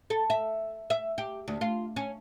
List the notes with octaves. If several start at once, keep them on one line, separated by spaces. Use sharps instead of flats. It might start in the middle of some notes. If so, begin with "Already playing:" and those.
A4
E5
E5
G4
D2
F4
C#4